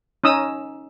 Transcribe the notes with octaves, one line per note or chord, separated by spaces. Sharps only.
C#4 D#4 D#6 E6